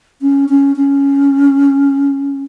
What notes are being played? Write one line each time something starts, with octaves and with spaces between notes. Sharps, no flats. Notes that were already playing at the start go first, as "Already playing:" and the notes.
C#4
C#4
C#4